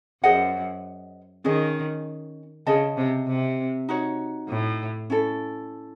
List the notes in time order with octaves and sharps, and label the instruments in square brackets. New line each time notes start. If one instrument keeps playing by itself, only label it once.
[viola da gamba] F#2 [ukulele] G#4 C5 D#5 F#5
[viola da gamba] D#3 [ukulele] C#4 G#4 D#5
[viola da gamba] C#3 [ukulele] G#4 D#5 A5
[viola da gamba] C3
C3
[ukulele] D#4 F#4 C#5
[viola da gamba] A2
[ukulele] C#4 E4 A4